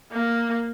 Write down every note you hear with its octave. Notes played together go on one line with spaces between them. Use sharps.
A#3